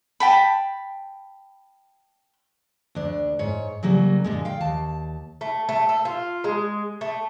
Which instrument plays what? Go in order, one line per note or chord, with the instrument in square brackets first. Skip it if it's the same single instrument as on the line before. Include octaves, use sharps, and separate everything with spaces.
[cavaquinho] G5 A5 B5
[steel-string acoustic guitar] D2 D4
G#2 C#5
C#3 F#3 G3 A#3
A#2 D3 G#3
F5 G5
D#2 A5
[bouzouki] A3
A3
A4
F4
G#3
A3